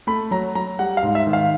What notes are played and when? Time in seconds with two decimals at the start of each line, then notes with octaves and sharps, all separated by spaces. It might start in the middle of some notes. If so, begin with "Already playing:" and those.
0.07 A3 B5
0.31 F#3 A#5
0.55 F#3 A#5
0.79 G3 F#5
0.97 F5
1.03 G#2
1.15 E5
1.27 D#3
1.33 F5